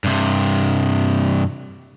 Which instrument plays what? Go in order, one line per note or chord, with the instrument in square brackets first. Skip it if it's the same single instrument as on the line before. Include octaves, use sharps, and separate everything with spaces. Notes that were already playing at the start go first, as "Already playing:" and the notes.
[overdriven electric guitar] G2 C3